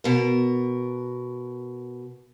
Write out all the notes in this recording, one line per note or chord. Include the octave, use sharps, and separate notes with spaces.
B2 A#4